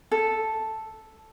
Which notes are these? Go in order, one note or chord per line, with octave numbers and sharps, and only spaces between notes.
A4